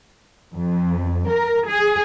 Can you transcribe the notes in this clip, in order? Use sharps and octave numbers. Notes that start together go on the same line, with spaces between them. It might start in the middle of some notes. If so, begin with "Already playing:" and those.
F2
A#4
G#4